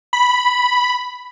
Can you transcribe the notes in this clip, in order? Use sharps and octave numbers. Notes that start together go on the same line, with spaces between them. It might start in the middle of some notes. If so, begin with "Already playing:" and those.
B5